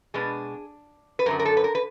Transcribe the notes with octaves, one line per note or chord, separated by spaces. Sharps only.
B2 G#3 B3 D4 G#4
B4
F#2 D3 F#3 A#4
A#4
A4
B4
A#4
B4